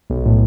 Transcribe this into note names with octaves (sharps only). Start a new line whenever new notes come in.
B1
A2